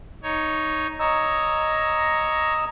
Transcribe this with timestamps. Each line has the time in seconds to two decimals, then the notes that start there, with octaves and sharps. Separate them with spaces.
0.23 D#4 C#5
0.99 C#5 D#5 A#5 E6